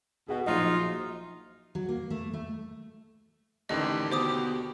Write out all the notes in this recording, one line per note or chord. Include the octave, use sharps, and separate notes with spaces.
B2 G#4 F#5
A#1 F#3 D#4 F4 D#5
F#3
A#3
A3
A3
A1 D#2 D3 D#3 G4 D#5
B2 C5 D6 D#6